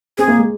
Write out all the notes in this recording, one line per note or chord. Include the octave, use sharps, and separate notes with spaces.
C4 G#4
A#3
G#3